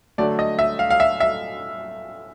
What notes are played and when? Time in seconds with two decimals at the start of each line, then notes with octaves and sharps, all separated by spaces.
0.18 D3 F#3 A3 D5
0.39 D#5
0.59 E5
0.79 F5
0.90 F5
1.00 E5
1.20 E5